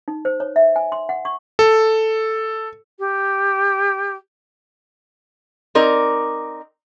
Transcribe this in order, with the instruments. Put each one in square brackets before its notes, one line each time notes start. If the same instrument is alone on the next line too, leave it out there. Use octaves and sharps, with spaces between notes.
[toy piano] D#4
C5
C#5
E5
G#5
C6
F#5
C#6
[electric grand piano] A4
[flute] G4
[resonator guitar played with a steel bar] C4 D#4 A#4 D5